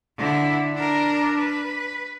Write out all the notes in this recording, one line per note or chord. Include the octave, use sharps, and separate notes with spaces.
D3 E4
D4 A#4
B4